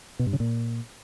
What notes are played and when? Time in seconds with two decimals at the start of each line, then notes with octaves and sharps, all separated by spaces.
0.19 B2
0.26 G2
0.33 C#3
0.40 A#2